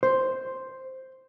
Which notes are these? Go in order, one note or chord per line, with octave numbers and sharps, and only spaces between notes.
C5